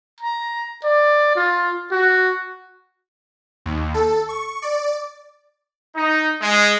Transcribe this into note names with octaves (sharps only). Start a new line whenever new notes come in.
A#5
D5
F4
F#4
D#2
A4
C#6
D5
D#4
G#3